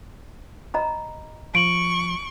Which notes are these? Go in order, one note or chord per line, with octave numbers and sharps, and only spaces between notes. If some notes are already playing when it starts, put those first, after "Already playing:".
D#5 A#5 B5
F3 C#6 D7 F#7